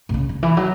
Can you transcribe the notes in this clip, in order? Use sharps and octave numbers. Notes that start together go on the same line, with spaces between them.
B2
C#3
C#3
E3
F#3